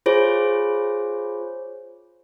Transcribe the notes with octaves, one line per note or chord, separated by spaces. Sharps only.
F4 G#4 C5 C#5